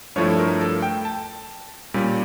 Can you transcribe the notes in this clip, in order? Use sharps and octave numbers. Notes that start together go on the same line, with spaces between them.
G2 F3 A3 E4 C#5
A4
A#4
A4
G5
A5
A#2 G3 C#4